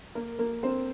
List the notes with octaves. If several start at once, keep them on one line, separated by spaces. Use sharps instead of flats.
A#3 A#4
A#3 A#4
C4 C5